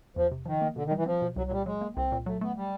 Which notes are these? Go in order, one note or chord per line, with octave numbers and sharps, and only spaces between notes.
E2 F3
C3
D#3 F3
A#3
B2 D3
D#3
G3
E3
F3 C4
B2
C2 F#3
F#3
A#2 G3
F#3 G#3
A#3
C2 C4
A#2
F#3 A3
A3 B3
G3